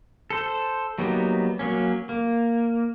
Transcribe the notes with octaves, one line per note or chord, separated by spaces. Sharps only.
A4 C5
F#3 G3 A#3 B3 D#4
F#3 A#3 C#4
A#3